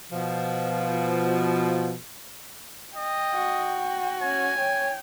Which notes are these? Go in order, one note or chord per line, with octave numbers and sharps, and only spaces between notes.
B2 F3
D#5 G5
F#4
C#4 G#5
C#5 G5